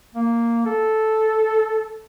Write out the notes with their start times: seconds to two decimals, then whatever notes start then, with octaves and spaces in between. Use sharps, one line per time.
0.15 A#3
0.66 A4